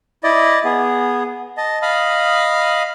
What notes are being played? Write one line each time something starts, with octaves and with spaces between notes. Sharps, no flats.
E4 D5 D#5
B3 G#4
D#5 A5
D#5 F5 B5 D#6